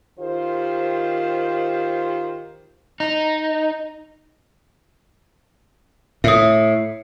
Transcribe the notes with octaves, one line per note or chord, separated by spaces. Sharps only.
D#3 F4 G4 C5
D#4
A2 E5 D#6